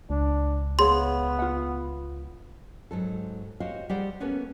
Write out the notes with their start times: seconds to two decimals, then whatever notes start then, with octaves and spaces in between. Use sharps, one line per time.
0.10 C#2 D4
0.79 B3 G#4 C#5 F5 C6
1.39 F4 F#5
2.91 G#2 F#3 A4
3.60 F#4 G4 C5 C#5 D#5 F5
3.89 G3 G4 G#4 C5 D5 F#5
4.20 A#3 B3 C#4 A4 B4 C#5